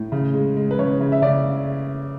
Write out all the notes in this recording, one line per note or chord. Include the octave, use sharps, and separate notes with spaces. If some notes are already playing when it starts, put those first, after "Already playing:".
Already playing: A2
C#3
G#3
G#3
B4
C#3 C#5
C#3
E5
C#3 D5